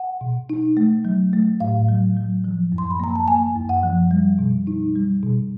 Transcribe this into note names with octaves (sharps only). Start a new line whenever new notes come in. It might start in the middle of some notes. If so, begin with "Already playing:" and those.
Already playing: F#5
B2
D#4
A3
F#3
A3
A2 F5
F#3
F#3
F3
F#2
C6
B5
A#3 A#5
A5
A#3 G#5
F#2
F#5
F3
G3
B2
D#4
G3
B2